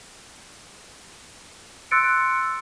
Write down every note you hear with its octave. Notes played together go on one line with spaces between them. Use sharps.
C6 E6 F#6 A6 C#7 D7